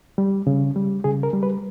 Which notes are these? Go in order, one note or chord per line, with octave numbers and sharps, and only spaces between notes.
G3
C#3
G3
C#3 G#4
A#4
G3
B4